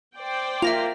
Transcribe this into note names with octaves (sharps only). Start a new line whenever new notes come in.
C5 D5 G5
A#3 F4 E5 A#6 F7